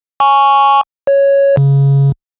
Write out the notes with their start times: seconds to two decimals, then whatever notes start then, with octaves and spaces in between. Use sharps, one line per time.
0.20 G#5 C#6
1.07 C#5
1.57 C#3